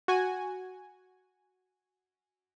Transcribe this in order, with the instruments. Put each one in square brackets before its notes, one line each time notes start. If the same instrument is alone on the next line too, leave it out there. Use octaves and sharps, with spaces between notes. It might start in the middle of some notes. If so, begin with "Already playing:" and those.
[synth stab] F#4 G#5